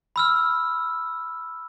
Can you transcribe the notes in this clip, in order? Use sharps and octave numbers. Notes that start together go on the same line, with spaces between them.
B5 E6 F6